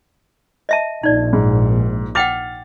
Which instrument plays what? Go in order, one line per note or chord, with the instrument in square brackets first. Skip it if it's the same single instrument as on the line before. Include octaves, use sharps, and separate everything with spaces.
[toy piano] D#5 E5 A5
[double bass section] A#1 [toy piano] D#4 D5
[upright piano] G#2
[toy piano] F#5 G5 D6 [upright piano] F6 A6 F7